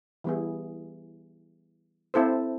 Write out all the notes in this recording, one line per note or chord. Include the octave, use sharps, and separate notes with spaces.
E3 G3 B3 E4 G#4
C4 E4 A4 C5